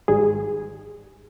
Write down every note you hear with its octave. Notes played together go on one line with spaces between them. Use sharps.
G#1 G#2 G3 G#4